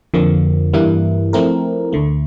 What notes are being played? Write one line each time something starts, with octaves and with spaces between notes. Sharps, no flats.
F2 D3 F3 A#3
G2 E3 G3 A#3 E4
F3 A3 C4 E4 A#4
D2 D3 A3